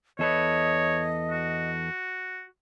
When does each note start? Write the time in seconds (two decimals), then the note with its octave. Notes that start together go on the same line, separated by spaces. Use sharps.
0.19 E2 A4 B4 C#5 D#5
1.31 F#4